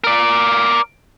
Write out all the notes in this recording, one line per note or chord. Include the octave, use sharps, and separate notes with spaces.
A#4 D5